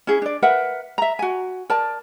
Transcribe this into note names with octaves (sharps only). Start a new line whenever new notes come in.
C#4 E4 G#4
D4 D5
A#4 B4 E5 F#5
E5 A#5
F#4 G#5
A#4 D5 A5